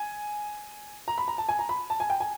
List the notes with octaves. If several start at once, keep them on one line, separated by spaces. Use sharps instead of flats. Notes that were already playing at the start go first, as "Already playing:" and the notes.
Already playing: G#5
A#5
B5
A#5
A5
G#5
A#5
B5
A5
G#5
G5
G#5